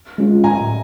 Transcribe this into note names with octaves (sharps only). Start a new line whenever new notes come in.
G#3 C#4 F4
A2 G#5 A#5